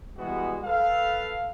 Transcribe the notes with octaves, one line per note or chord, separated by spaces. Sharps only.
E3 G3 G#3 B3 F#4
A4 B4 F5